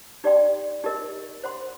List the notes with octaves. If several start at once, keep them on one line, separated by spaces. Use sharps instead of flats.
D#4 G4 D5 G5 C6
D#4 G4 A#4 D#5
C5 F#5 C6